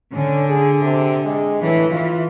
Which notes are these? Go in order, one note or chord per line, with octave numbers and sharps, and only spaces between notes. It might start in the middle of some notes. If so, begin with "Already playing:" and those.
D3 C#4
G#4
C3
G#3
A2 E3
E3 F4